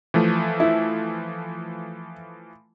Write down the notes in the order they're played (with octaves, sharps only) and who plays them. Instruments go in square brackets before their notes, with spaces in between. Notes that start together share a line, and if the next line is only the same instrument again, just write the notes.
[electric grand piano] E3 F3 A3
[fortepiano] E4